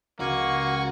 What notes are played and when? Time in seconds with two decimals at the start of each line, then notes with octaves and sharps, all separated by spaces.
0.20 C#2 A#3 F#4 G#5 C#6